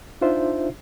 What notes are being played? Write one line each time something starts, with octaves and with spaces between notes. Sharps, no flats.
D4 D#4 F4 C5 E5